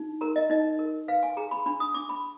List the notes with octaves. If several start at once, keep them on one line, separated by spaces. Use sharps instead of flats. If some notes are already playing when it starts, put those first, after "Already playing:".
Already playing: D#4
A#4 A#5
D#5
D#4 D#5
A#4
B4 F5
G#5
G#4 A#5
B5
D4 B5
D#6
D4 D6
B5